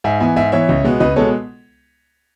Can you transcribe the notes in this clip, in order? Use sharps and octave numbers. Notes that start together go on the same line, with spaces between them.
G#2 E5 G#5
E3 B3 E5 G#5
G#2 E5 G#5
E3 B3 C#5 E5
C#2
B2 G#3 B3
C#2 B4 D#5
B2 G#3 B3 A4 C#5